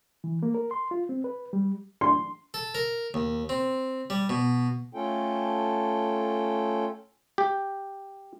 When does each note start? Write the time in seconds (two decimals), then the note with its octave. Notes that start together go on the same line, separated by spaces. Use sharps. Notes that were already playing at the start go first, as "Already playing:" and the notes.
0.24 E3
0.43 A#3
0.54 A#4
0.71 C6
0.91 F4
1.09 C4
1.24 B4
1.53 G3
2.01 C6
2.54 A4
2.75 A#4
3.14 D#2
3.49 C4
4.10 G3
4.29 B2
4.94 A3 C#4 F4 A4 G5
7.38 G4